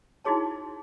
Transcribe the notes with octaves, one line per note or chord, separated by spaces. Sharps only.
D#4 E4 F#4 G#4 C#5 A5